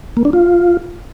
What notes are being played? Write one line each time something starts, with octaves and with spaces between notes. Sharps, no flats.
A#3
D4
F4